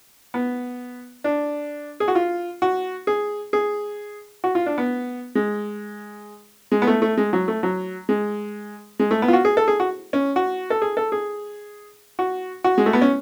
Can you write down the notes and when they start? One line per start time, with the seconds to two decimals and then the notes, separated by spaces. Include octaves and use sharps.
0.34 B3
1.24 D4
2.00 G#4
2.08 F#4
2.15 F4
2.62 F#4
3.07 G#4
3.53 G#4
4.44 F#4
4.55 F4
4.66 D4
4.78 B3
5.35 G#3
6.72 G#3
6.82 B3
6.87 A3
7.02 A3
7.17 G#3
7.33 F#3
7.48 A3
7.63 F#3
8.09 G#3
8.99 G#3
9.11 A3
9.22 B3
9.28 F4
9.33 F#4
9.45 G#4
9.57 A4
9.68 G#4
9.80 F#4
10.13 C#4
10.36 F#4
10.70 A4
10.82 G#4
10.97 A4
11.12 G#4
12.19 F#4
12.64 F#4
12.78 G#3
12.86 A3
12.93 B3
13.02 C#4